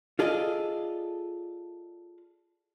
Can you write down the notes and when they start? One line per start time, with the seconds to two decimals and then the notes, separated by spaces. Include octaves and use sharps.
0.19 F4 G#4 A4 D5 D#5